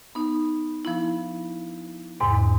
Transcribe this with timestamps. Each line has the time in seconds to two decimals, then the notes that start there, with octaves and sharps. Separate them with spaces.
0.15 B3 D#4
0.85 F3 B3 E4
2.20 E2 G#2 C3